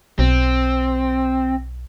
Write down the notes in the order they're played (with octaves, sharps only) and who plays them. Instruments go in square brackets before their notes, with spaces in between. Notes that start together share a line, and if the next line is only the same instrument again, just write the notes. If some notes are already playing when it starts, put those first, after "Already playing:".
[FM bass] B1 [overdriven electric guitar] C4